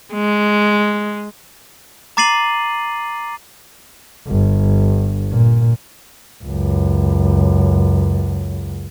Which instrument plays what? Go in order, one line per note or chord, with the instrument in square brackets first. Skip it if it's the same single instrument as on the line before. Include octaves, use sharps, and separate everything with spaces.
[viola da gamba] G#3
[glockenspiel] A#5 D6 A6 C7 D#7 F#7
[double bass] G1
A#2
C#2 F#2